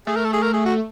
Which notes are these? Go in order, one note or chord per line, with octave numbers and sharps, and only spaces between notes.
A3 G#4
A#4
A4
G#4
A#4
G#4
F#4